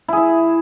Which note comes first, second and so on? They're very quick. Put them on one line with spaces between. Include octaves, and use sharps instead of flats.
E4 G#4 E5